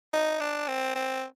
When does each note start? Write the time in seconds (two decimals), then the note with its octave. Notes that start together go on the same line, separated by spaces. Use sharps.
0.14 D#4
0.40 D4
0.68 C4
0.96 C4